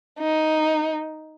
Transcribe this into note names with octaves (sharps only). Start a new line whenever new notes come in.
D#4